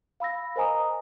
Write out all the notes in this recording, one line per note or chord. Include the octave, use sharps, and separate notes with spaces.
F5 B5 E6 A#6
A#4 C5 D#5 G#5 A#5 D#6